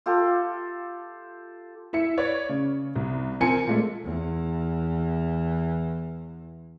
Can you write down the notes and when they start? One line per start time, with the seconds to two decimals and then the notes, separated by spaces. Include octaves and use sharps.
0.06 F4 G4 A4
1.93 E4 E5 C#7
2.17 B4 C#5 D5
2.49 C#3
2.96 C2
3.41 F3 C4 A#4 G#5 C#7
3.67 A#2 G#3 A3
4.04 E2 E3